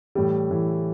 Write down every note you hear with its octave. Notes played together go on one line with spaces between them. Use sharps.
A2 E3 G3
A2 E3